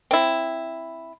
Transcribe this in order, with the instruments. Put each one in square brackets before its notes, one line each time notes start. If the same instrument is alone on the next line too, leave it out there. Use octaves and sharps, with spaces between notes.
[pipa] C4 E4